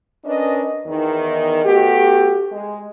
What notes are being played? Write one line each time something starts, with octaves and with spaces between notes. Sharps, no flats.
C#4 D4 A#4 B4 D#5
E2 D#3
A3 B3 F#4 G4
G#3